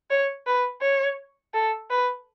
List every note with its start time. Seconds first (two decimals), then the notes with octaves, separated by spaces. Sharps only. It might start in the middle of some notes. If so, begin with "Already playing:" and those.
0.10 C#5
0.47 B4
0.82 C#5
1.54 A4
1.90 B4